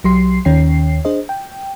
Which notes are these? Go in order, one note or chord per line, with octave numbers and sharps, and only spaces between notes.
B1 F#3 G4 C6 C7
D#2 D#3 C#4 C#5 G5 C7
D4 G#4 C5 D#5
G5